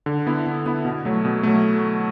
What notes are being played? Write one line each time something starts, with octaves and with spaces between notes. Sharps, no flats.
D3
B3 E4
D3
B3 E4
B2
F#3 A3
B2
F#3 A3